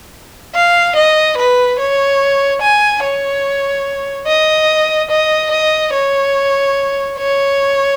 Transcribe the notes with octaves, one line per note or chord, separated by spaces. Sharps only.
F5
D#5
B4
C#5
G#5
C#5
D#5
D#5
D#5
C#5
C#5